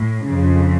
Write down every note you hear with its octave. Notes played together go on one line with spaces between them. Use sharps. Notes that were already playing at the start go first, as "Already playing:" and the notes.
Already playing: A2
F2 C#3